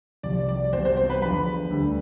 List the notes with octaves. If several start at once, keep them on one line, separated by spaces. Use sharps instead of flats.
C2 C3 F3 D5
D5
C2 C3 E3 B3 C5
C5
C5
B4
E2 D3 F3 B4
D2 D3 G3